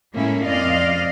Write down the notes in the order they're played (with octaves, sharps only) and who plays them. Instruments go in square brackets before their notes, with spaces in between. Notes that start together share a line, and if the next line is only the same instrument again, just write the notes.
[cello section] A2 G#3 A#3 C#4 E4
F2 C4 D5 D#5 F5